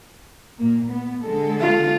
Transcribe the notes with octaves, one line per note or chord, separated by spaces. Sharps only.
A#2 A#3
B3
D3 G#3 A4
F4